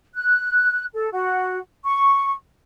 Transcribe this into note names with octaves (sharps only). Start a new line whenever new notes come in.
F#6
A4
F#4
C#6